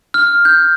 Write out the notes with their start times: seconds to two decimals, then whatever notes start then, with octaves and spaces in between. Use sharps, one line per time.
0.14 F6
0.45 G6